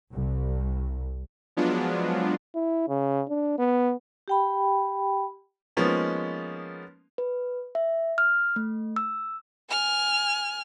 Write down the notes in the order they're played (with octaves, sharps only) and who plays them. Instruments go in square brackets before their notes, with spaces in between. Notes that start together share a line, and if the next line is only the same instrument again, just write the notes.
[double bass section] C2
[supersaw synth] F3 F#3 G#3 B3 D4 F4
[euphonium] E4
C#3
D4
B3
[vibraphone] G4 G5 B5
[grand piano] F3 G#3 A#3 B3 C#4 D#4
[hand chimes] B4
E5
F6
A3
E6
[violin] G#5 F6